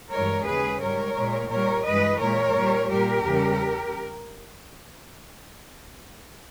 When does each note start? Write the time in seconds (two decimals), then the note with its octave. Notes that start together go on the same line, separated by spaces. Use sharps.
0.12 G2 E3 G#3 A#4 C#5
0.46 D#2 C#3 G#3 G#4 B4
0.81 G#2 G3 A#4 C#5
1.16 A#2 G#3
1.50 A#2 G3 A#4 C#5
1.85 G2 E3 G#3 B4 D#5
2.20 A#2 G#3 A#4 C#5
2.55 A#2 G3
2.89 A#2 G3 G4 A#4
3.25 E2 C#3 G3